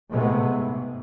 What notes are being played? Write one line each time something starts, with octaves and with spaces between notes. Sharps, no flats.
A2 C3 G#3 A3 B3
G#2